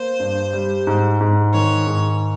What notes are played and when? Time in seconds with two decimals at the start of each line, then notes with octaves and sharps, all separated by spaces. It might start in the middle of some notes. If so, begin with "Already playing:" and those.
Already playing: A#3 C5
0.20 G2
0.53 G3
0.87 G#2
1.21 G#2
1.53 D#3 C#5
1.87 G#2